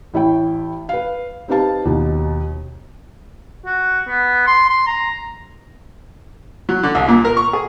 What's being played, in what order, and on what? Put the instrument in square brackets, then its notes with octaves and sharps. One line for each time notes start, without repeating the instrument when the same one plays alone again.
[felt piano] A1 E4 C#5 G5
B4 F5
C4 D#4 G4 B4 F5 A5
D#2 B2
[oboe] F#4
B3
C6
C6
A#5
[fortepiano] F#3
D3
C2
A#2
A#4
C#6
G#4